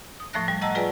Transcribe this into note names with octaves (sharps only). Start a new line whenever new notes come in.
D#6
A2 F3 A3 E5 F#6 A#6
G3
D#5 F#5 A5 A#5 E6
F4 G#4 B4 D5 G#5